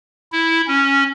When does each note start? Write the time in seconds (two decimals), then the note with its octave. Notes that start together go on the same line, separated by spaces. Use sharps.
0.32 E4
0.68 C#4